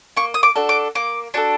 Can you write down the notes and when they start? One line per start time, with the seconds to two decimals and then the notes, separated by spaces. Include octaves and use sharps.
0.17 A#3 C#6
0.34 D#6
0.43 D6
0.56 D4 F#4 A4
0.69 D6
0.95 A#3 D6
1.34 D4 F#4 A4